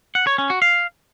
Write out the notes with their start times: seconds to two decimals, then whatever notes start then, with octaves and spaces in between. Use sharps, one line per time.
0.15 F#5
0.27 C#5
0.38 C#4
0.50 F#4
0.62 F5